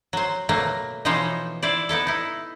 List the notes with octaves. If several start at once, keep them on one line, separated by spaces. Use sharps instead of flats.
F#3 C5
B2 F#3 A3 A#3
B2 E3 F3 D#4 C5 C#5
E4 C5 D5
B3 D#4 E4 A4
D#4 E4